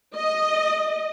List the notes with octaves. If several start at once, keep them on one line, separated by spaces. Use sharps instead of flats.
D#5